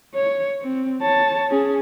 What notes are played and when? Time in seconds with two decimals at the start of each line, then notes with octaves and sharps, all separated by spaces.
0.15 C#5
0.62 C4
1.02 C#5 A5
1.50 C#4 G#4